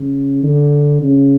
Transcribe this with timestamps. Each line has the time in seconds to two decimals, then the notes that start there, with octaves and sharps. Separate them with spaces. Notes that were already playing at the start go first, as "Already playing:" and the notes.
Already playing: C#3
0.43 D3
1.02 C#3